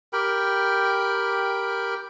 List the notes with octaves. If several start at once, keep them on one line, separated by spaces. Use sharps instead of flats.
G4 A#4 G5 B5